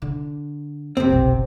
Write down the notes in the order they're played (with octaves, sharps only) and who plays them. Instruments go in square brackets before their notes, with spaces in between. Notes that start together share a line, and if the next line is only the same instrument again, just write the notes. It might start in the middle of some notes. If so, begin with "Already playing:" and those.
[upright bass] D3
[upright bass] F2 [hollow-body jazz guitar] C3 C4
[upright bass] F#1 B1